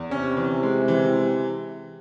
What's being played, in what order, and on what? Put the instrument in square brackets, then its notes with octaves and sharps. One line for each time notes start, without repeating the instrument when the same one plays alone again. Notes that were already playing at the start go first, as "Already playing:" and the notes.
Already playing: [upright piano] E2
[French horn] C3 [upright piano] C#4
[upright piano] E3
G#3
E3